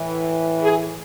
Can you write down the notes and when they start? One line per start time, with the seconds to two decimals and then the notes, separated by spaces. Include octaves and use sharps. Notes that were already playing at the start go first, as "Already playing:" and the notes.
Already playing: A2 E3
0.62 G#4